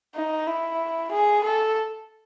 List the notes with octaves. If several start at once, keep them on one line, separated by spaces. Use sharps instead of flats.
D#4
E4
G#4
A4